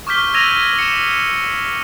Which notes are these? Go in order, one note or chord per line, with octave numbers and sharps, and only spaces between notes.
C#6 D6 F6 G6 B6 G7
E6 G#6 A#6 D#7 F7
C#7 E7